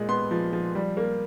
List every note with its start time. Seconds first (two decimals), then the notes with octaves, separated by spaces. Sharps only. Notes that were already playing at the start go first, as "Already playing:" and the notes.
Already playing: A#2 G#3
0.09 B3 C6
0.31 F3
0.53 F3
0.75 G3
0.97 A#3